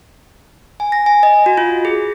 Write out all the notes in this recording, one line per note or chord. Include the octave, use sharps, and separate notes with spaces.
G#5
A#6
G#5
D#5
F#4
F4
G#4